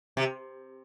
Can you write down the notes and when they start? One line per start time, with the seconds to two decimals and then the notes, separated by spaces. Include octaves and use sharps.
0.17 C3